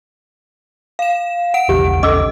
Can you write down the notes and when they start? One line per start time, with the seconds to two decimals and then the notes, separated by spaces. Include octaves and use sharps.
0.99 F5 E7
1.54 F#5 D7
1.69 E1 A#1 E2 G4
2.03 C#4 A4 D#5 D6 E6